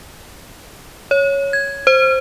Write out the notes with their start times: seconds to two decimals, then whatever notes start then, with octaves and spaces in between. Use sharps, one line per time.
1.11 C#5
1.53 G#6
1.87 C5